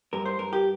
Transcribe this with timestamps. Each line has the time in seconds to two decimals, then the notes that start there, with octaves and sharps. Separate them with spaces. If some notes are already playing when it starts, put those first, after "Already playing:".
0.13 G2 A#4
0.26 C5
0.39 G2 A#4
0.53 G4